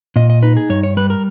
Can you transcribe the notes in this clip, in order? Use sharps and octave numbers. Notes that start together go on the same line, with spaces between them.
A#2 D#5
D#5
D#4 B4
G#4
G2 C#5
C#5
G3 B4
A#4